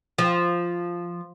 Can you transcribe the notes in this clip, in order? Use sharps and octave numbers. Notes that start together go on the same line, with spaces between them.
F3